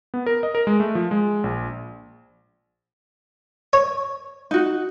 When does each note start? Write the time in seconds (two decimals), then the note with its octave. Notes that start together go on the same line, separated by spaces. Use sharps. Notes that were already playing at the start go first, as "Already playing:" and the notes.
0.14 B3
0.26 A#4
0.43 D#5
0.55 A#4
0.67 G#3
0.80 A3
0.95 F3
1.11 G#3
1.44 A#1
3.73 C#5
4.51 D#4 F#4